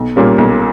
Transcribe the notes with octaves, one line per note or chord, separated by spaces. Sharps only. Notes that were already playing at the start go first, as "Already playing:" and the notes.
Already playing: B1
A#2 G3 A#3 C#4
B1